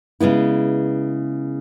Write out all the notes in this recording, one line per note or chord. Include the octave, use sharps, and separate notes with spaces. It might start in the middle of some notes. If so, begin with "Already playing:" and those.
C#3 G#3 B3 E4